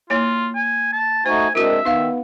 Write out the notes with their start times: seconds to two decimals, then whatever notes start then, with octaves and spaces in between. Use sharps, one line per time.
0.10 A#3 E4 F4 C#5
0.55 G#5
0.93 A5
1.26 A3 D#4 F#4 C5 G#5
1.55 G#3 C4 D4 E4 F#4 A#4 E5
1.85 D#3 B3 D#4 F5